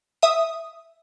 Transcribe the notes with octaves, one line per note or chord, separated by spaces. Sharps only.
E5 D#6